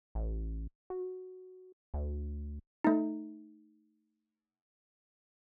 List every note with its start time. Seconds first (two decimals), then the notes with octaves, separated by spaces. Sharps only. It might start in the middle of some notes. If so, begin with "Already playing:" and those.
0.15 A1
0.90 F#4
1.94 D2
2.84 A3 D#4